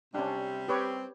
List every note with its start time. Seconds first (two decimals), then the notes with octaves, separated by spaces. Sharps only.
0.14 C3 G3 C#4 D4
0.68 C4 G4 B4 C#5